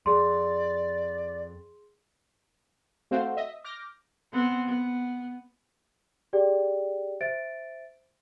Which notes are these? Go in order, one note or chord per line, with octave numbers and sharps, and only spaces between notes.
F2 G#4 D5 C6
A3 C4 F#4 C5 F5
D#5 E5
D6 F6 G6 A#6
B3 C4
B3
G4 G#4 D5 G5
C5 E5 A6 D7